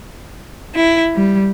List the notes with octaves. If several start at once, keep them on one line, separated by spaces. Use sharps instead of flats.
E4
G3